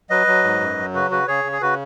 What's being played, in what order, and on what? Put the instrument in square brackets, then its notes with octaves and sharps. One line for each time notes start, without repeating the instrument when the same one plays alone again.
[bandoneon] F#3 B4 D#5
F#3
G#2
F#2
F#3
C#3 F#4 B4
C#3 F#4 B4
C#3 G#4 C#5
C#3
G#4
C#3 F#4 B4